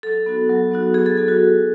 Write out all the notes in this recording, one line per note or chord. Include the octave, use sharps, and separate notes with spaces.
F#3 A4
B3 D#4 F#4
F#3
B3 D#4 F#4
F#3 G#4
A4
B3 D#4 F#4 A4
F#4
F#3